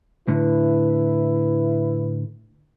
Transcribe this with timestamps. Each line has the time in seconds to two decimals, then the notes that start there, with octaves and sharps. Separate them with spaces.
0.28 A2 D3 E4 B4